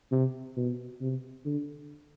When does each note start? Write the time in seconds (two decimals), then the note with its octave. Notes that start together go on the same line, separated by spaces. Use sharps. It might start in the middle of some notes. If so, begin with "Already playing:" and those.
0.12 C3
0.57 B2
1.01 C3
1.45 D3